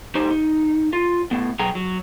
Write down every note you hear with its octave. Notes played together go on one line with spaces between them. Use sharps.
A2 D#4 G4 C5
D#4
F4
A2 B3
B2 F#3 G#4 G5 A#5
F#3